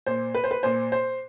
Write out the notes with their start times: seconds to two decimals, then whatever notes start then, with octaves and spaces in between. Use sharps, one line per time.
0.06 A#2 C5
0.34 B4
0.44 C5
0.51 B4
0.63 A#2 C5
0.92 C5